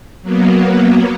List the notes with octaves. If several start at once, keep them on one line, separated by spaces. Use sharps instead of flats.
F#3 A#3 B3